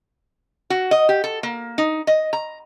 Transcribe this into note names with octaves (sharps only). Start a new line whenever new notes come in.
F#4
D#5
G4
A4
A#3
D#4
D#5
A#5